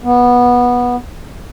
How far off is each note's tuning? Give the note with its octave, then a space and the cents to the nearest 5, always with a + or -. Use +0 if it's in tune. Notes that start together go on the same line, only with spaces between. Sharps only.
B3 -15